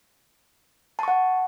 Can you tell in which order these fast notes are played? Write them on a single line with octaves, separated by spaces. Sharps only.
A5 C#6 F#5